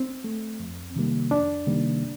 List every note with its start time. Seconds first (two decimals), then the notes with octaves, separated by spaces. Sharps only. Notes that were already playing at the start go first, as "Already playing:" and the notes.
Already playing: C4
0.24 A3
0.60 F2
0.96 C3 D#3 G3 A#3
1.31 F2 D4
1.67 C3 D#3 G3 A#3